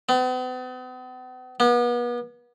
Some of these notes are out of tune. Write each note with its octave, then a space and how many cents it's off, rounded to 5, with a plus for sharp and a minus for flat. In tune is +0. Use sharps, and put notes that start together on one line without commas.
B3 +45
B3 -35